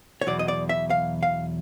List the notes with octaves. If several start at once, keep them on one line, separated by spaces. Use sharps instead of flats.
C#5
E2 B2 F#3 D5
D#5
D5
E5
F5
F5